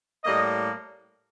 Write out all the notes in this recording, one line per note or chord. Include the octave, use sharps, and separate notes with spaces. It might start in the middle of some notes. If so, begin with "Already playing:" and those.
A2 G3 A#3 D#5